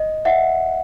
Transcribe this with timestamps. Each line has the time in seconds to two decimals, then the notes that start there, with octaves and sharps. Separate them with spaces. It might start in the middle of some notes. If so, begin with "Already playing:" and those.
Already playing: D#5
0.25 E5 F#5